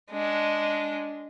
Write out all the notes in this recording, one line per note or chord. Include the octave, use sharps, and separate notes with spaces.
G#3 D4